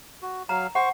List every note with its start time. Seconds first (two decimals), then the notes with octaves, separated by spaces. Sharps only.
0.22 F#4
0.49 F#3 F5 A#5
0.75 C5 F#5 C#6